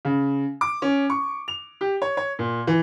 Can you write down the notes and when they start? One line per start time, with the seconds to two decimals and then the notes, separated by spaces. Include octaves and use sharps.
0.05 C#3
0.61 D6
0.82 C#4
1.10 C#6
1.48 F7
1.81 G4
2.02 C#5
2.17 C#5
2.39 A#2
2.67 E3